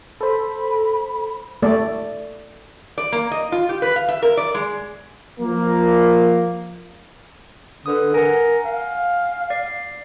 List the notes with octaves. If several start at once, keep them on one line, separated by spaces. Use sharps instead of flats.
A4 C5 B5
A3 D5
D5
A#3
D#5
F4
G4
B4
F5
E5
A#4
D5
G#3
F3 A#3
D3 A4 B4 D#6
A#4 F#5 G#5
F5
D5 C7